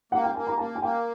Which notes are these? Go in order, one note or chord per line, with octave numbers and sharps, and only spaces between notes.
A#3 F#5
G5
A#3 G#5
A#5
A#3 A5
G#5
A#3 G5